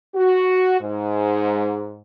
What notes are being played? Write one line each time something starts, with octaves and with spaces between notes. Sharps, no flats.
F#4
G#2